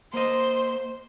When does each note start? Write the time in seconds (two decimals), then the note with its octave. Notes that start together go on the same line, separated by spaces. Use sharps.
0.14 A#3 C5 D#5 C6